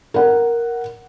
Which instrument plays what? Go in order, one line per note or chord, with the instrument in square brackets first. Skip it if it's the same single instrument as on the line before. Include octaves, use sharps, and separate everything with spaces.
[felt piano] A#4 F#5